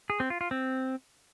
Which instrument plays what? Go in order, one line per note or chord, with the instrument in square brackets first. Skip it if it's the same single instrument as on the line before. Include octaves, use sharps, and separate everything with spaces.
[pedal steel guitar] G#4
C4
F4
F4
C4